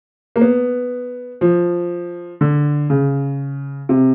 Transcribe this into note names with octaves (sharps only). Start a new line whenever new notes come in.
A#3
B3
F3
D3
C#3
C3